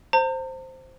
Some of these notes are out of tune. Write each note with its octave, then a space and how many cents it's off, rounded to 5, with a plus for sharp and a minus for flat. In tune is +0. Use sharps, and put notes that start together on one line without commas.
C5 +0 A#5 -45